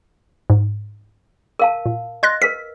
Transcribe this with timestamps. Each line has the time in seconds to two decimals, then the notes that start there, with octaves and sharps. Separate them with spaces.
0.50 G#2
1.59 A#4 F5 A5
1.86 A#2
2.23 D#5 C6 F#6 A#6
2.42 A#4 B4 B6